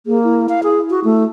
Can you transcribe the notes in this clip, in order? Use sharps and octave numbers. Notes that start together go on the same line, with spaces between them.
A#3 G#4
E4
F5
G#4
F#4
A3